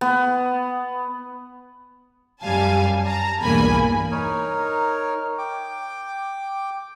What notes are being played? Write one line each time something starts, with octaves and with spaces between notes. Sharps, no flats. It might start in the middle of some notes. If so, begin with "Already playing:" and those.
B3
F#2 G3 F5 G#5 A5
A5 A#5
B1 E2 G2 A#3 G#5 B5
D#4 A#4 C#5
G5 D6